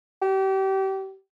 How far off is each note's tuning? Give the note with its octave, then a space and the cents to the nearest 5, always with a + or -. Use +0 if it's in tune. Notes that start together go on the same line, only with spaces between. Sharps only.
G4 -30